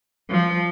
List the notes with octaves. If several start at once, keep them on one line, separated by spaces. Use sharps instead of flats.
F3